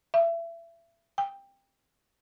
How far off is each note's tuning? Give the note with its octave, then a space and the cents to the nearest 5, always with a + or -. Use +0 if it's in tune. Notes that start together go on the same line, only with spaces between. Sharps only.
E5 +30
G5 +15